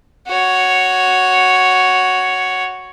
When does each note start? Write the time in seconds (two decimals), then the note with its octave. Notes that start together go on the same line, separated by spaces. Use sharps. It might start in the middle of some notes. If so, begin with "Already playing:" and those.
0.27 F#4 C#5